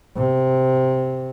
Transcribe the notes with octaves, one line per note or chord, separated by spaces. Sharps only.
C3